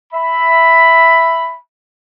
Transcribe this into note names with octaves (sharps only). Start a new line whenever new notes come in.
E5 B5